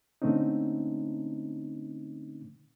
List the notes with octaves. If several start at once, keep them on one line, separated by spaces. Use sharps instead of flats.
A#2 D3 A3 C4 C#4 D#4